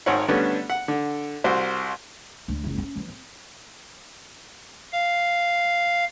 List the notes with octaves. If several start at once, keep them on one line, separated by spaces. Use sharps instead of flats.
G#1 D#3 C5 C#5 F#5
D3 G3 A3 B3 C#4 D4
F#5
D3
C2 F#4 C5
D2
F#1 C#2
C4 C#4
E3 F#3
C4
F5